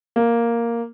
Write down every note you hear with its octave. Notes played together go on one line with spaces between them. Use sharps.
A#3